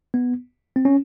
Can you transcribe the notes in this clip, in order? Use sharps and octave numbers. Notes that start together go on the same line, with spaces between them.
B3
C4
C#4